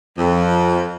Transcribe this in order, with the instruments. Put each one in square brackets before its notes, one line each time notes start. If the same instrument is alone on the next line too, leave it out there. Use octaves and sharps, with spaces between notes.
[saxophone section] F2